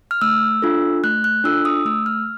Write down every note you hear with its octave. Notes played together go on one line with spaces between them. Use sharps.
F6
A3 E6
D4 F4 A4
A3 F#6
F#6
D4 F4 A4 E6
D#6
A3 E6
F6